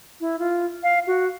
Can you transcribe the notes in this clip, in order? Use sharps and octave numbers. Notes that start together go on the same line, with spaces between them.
E4
F4
F5
F#4